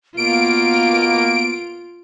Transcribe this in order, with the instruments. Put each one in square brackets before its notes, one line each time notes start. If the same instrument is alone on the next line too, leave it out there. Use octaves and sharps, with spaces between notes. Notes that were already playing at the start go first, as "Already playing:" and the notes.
[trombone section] B2 A#3 [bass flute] B3 [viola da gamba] F4 [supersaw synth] D7